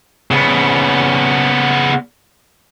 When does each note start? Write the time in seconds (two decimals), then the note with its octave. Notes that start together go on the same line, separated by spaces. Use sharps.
0.31 C#3 B3